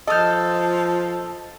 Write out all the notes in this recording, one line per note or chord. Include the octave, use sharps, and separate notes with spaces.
F3 A4 D#5 D#6 F6 G6